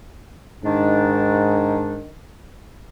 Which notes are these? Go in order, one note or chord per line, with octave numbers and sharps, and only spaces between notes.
G#2 D#3 D4